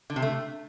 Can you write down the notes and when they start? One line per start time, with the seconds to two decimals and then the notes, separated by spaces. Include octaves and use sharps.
0.10 D3
0.16 C3
0.22 A3